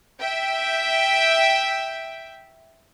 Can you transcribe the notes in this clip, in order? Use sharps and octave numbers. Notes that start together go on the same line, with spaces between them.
E5 G5